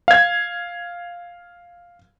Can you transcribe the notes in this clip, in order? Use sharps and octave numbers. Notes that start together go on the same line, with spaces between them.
F5 G#6